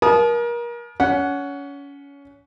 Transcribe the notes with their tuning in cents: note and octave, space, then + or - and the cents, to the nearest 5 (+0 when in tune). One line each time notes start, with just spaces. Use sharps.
A#4 +30 A5 -35 D#6 -10
C#4 +25 F#5 +0